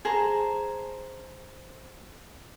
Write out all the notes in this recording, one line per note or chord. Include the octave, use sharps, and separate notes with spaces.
G#4 C5 A5 A#5